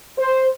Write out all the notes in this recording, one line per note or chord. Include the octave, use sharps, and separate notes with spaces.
C5